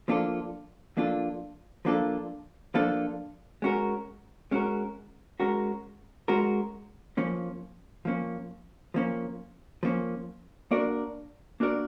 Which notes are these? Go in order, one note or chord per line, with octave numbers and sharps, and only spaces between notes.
F3 A#3 D4 F4 A4
F3 A#3 D4 F4 A4
F3 A#3 D4 F4 A4
F3 A#3 D4 F4 A4
G#3 C#4 F#4 A#4
G#3 C#4 F#4 A#4
G#3 C#4 F#4 A#4
G#3 C#4 F#4 A#4
F3 A#3 C#4
F3 A#3 C#4
F3 A#3 C#4
F3 A#3 C#4
A#3 D4 F#4 A#4 D5
A#3 D4 F#4 A#4 D5